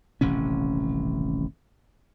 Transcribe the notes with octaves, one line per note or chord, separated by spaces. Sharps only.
D#1 A1 C3 C#4